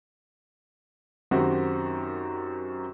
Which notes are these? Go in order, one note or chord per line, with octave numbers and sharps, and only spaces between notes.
F#2 D#3 C4 F#4 G4